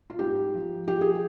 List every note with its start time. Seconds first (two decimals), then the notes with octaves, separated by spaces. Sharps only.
0.10 F4
0.19 G#2 G4
0.54 F3
0.87 F3 G4
1.01 G#4